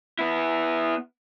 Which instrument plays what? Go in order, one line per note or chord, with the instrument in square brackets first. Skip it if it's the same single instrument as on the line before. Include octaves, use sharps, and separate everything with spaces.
[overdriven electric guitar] B3 E4